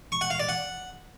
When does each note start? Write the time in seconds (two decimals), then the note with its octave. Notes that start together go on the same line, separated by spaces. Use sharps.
0.12 C#6
0.21 F#5
0.30 F5
0.39 D5
0.49 F#5